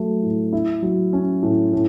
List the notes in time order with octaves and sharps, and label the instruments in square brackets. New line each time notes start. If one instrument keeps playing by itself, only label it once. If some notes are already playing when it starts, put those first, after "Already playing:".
Already playing: [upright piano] F#3 A3
A2
E4
F#3
C#4
A2
A2